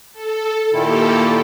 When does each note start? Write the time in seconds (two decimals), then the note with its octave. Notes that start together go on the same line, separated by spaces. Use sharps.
0.13 A4
0.73 A#2 D#3 A#3 E4 G4 A4